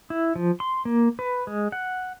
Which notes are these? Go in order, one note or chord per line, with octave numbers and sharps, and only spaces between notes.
E4
F3
C6
A#3
B4
G#3
F#5